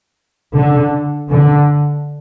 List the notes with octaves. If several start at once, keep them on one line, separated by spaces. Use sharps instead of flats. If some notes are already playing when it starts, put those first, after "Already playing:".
D3
D3